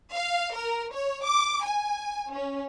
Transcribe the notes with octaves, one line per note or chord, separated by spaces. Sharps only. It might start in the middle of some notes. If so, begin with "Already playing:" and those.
F5
A#4
C#5
D6
G#5
C#4